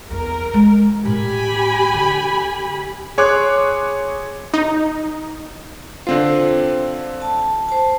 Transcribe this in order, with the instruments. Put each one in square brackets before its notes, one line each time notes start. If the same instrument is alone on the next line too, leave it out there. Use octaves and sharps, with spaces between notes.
[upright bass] E2 [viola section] A#4
[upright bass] G#3
[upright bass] A2 [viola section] G4 G#5 B5
[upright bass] D3
[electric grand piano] G#4 C#5 C6 D6 F#6
[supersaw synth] D#4
[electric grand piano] D3 C4 F4 [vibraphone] C5
[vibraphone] A5
C5 A5